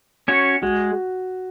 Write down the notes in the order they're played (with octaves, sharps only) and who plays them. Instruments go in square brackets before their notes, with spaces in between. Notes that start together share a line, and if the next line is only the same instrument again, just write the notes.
[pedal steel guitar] C#4 F#4 C#5
[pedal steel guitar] G#3 [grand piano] F#4